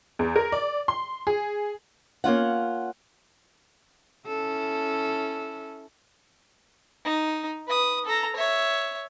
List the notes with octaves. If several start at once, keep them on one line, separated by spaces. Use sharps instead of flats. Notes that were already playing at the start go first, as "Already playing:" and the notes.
E2
A#4
D5
C6
G#4
A#3 C#4 F4 F#5
C#4 E4 A4
D#4
B4 D#6
A4 A#5
C#5 E5